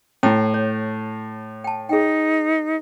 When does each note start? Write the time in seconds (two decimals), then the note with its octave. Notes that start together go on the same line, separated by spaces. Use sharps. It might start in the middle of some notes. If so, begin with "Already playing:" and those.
0.23 A2 E4 G5
0.54 C#5
1.64 G5 A5
1.89 D#4 G#4 G5